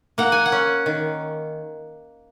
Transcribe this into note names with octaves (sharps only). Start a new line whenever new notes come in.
A#3 F#5
G#5
F#5
C#4
D#3